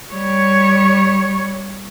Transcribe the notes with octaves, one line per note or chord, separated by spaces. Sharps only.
G3 C#5